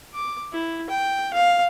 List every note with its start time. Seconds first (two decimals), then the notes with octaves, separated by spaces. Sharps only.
0.14 D6
0.53 E4
0.90 G5
1.34 F5